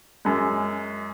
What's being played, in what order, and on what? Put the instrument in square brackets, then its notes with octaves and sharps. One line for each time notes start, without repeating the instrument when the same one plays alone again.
[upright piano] F#2 G#3